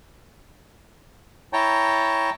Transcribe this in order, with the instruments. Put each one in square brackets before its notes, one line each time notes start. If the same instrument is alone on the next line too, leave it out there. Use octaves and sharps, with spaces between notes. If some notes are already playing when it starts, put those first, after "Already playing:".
[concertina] E4 C#5 G5 A5 A#5